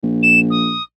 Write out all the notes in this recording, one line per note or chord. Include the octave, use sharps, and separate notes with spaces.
A#1
E7
D#6